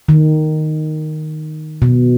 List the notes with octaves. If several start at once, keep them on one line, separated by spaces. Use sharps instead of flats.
D#3
B2